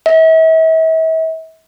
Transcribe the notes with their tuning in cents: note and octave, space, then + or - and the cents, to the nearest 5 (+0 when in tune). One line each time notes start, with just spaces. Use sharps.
E5 -40